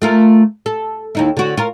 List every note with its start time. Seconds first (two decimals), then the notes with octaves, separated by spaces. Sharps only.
0.02 A3 F4 A#4
0.66 A4
1.15 D#2 D#4 E4
1.37 D3 F#4
1.57 F4 A#4